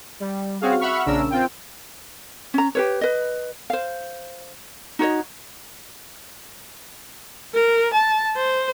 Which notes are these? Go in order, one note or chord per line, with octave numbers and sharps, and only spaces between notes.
G3
C4 C#4 F#4 G#4 F5
E5 F#5 B5 C#6 F6
A#1 C#3 C#4 D4 A#4 E6
C4 F4 G5
C#4 A#5
G4 B4 C#5
B4 D#5
C5 F5
D#4 F#4 C#5 D#5
A#4
A5
C5